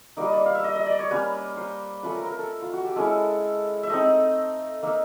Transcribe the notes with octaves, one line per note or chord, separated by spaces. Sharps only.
G3 A#3 D#4 D5
D#5
D5
F5
E5
D#5
D#5
D5
C#5
G3 A#3 C#4 B4
C5
A3 C#4 F4 B4
A#4
A#4
A4
F4
F#4
G4
G#3 C#4 E4 A4
E5
A3 C4 D#4 D#5
A#3 D#4 E5